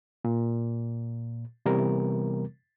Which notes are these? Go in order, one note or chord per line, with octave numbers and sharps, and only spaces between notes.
A#2
C3 E3 G3 B3 A#4